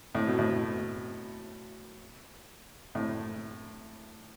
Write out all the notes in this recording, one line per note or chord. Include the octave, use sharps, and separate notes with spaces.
A2
B2
A2
A2